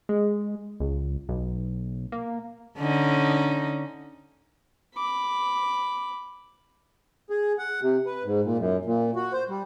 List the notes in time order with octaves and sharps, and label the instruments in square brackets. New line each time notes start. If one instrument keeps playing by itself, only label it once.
[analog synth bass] G#3
C#2
B1
A#3
[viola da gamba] D3 C#4 D#4
[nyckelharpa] B5 D6
[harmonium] G#4
F#5
C3
B4
G#2
A#2
F#2
A#2
F#4
C5
G3